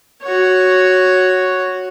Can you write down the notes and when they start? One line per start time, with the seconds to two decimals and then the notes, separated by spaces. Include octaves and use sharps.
0.23 F#4 C#5